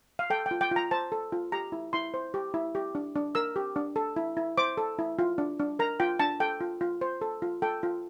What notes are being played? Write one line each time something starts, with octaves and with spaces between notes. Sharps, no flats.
F5
A4 G5
G5
F4
G5
F4 A#5
C5 A5
A4
F4
G4 A#5
E4
E4 C6
C5
G4
E4
G4
D4
D4
A#4 E6
G4
D4
A4
E4
E4
C5 D6
A4
E4
F4
D4
D4
A#4 A#5
F4 G5
D4 A5
A4 G5
F4
F4
C5
A4
F4
A4 G5
F4